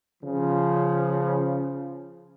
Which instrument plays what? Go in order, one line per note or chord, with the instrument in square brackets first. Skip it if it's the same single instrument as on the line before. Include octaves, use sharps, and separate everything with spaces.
[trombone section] C#3 F3